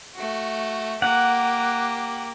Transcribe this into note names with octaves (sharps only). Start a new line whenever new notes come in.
A3 F#4
A#3 G4 F#5